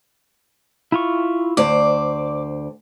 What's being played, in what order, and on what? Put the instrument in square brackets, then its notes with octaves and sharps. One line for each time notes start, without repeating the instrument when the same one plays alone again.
[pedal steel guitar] E4 F4 C#6
[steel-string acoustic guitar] D2 C5 D5 [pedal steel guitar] D6